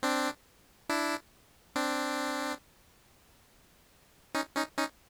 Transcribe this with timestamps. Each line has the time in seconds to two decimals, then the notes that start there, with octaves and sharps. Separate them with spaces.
0.03 C4 D4
0.89 D4 E4
1.76 C4 D4
4.35 C#4 D#4
4.56 C#4 D#4
4.78 C#4 D#4